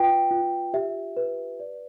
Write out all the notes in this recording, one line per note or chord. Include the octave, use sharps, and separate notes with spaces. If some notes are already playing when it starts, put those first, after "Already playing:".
Already playing: F4 B4 G5
F4
G4 E5
B4
D5